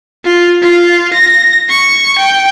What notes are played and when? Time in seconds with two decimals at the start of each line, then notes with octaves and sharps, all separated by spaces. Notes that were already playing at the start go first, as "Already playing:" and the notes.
0.25 F4
0.62 F4
1.13 A#6
1.69 C#6
2.18 G5